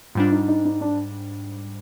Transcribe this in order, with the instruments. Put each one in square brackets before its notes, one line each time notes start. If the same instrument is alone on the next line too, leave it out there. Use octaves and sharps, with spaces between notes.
[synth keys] G#2 G3 D4 [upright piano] F4
[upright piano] D#4
D#4
D#4
D4